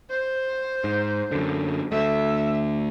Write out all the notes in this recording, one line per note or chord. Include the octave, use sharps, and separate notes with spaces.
C5
G#2
F#2 D3
D2 A3 E5